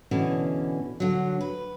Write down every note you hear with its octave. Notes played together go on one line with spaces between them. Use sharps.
B2 D3 E3 C#4
D3 F#3
B4